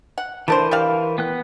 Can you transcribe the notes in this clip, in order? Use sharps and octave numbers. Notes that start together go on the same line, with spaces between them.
F#5
E3 A3 D4 A#4 C5
G3 D5 F5
B3 G5 F#6